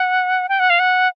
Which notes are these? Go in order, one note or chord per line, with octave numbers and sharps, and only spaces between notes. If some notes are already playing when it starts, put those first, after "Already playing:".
Already playing: F#5
G5
F#5
F5
F#5